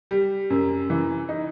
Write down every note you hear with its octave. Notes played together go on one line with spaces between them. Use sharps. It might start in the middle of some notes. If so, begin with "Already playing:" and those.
G3
F#2
E3
D#4